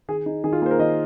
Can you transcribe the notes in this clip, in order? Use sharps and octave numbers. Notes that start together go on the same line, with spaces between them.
D#3 G#4
D#4
D#3 G#4
F4
A#3 G#4 C5
A#4
D#3 D#5